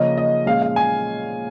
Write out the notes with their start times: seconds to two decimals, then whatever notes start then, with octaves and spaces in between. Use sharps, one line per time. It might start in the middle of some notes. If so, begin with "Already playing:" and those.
Already playing: C#3 F3 A#3 C#4 D#5
0.17 D#5
0.46 A#2 F3 G#3 C#4 F5
0.62 F5
0.76 G#5